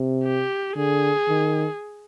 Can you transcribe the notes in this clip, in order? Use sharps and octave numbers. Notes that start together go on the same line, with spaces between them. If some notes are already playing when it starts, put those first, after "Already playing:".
Already playing: C3
G4
D3 G#4
D#3